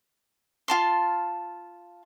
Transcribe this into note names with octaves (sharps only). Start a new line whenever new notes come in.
F4 A5 C6